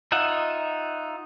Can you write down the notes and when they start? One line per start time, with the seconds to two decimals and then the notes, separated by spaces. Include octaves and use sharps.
0.12 D#4 F4 E5 F#5